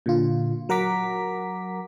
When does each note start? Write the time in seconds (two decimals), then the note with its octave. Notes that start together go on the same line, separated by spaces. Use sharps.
0.06 A#2 D3 F4
0.69 F#3 A#4 F#5 A#5 D6 B6